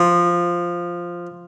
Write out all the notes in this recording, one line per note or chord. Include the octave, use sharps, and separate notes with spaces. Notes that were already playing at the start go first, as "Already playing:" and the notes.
Already playing: F3